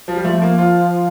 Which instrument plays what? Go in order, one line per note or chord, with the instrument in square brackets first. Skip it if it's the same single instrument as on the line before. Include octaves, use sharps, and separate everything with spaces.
[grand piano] F3
G3
[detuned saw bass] F3 [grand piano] A3
[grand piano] A#3
F4